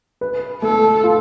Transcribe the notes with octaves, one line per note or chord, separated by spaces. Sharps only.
B4
A3 A4
F4